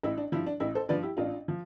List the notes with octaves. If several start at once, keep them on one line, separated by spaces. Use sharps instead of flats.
A1 E4
D4
G2 F3 E4
D4
A1 E4
A4 C5
G2 F3 B4 D5
E4 G4
A1 D4 F4
F3